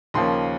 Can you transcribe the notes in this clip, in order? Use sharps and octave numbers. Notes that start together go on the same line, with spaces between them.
D#2 C#3 F3 A#3 C#4 C6